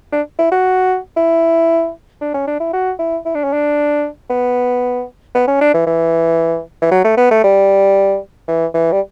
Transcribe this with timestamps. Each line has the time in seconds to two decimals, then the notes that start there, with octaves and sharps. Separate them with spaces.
0.12 D4
0.39 E4
0.52 F#4
1.17 E4
2.21 D4
2.34 C#4
2.47 D4
2.60 E4
2.73 F#4
2.99 E4
3.25 E4
3.35 D4
3.44 C#4
3.53 D4
4.30 B3
5.35 B3
5.48 C#4
5.61 D4
5.74 E3
5.87 E3
6.82 E3
6.91 F#3
7.04 A3
7.17 B3
7.31 A3
7.44 G3
8.48 E3
8.74 E3
8.92 G3